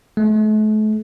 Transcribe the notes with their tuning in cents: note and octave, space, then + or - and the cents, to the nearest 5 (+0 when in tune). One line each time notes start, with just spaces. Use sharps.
A3 -40